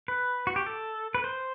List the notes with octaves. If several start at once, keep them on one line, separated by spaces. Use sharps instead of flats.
B4
F#4
G4
A4
B4
C5